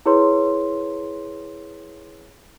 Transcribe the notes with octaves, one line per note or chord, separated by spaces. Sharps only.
E4 G#4 B4 C#5 C6